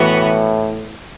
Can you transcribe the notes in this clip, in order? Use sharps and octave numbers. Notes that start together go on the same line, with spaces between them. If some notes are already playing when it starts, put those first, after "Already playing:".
Already playing: A2 E3 B3 F#4